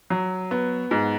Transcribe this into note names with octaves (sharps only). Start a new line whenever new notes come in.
F#3
B3
G#2